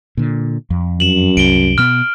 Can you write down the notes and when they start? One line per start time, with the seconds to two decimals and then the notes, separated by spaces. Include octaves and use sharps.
0.17 A#2 D3
0.70 F2
1.00 F#2 E7 F#7
1.37 C2 D7 G7
1.78 B2 B3 F6